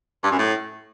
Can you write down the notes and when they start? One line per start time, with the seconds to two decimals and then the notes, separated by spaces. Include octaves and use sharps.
0.23 G2
0.31 F#2
0.38 A2